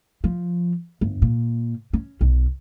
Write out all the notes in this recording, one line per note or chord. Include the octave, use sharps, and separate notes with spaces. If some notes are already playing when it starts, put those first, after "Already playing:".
F3
G1
A#2
C#4
B1